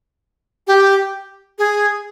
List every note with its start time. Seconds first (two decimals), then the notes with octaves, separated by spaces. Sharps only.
0.67 G4
1.59 G#4